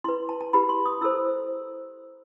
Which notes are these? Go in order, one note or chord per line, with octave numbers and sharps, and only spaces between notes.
E4 B4 C6
A5
A5
E4 G4 B4 B5
C6
D#6
E4 A4 C5 E6